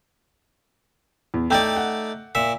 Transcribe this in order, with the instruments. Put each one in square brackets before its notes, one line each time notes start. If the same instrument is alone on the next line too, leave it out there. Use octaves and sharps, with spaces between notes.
[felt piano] E2
[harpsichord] A3 D#4 D5 [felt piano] G5 G6
[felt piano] F#5
[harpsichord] A#2 E5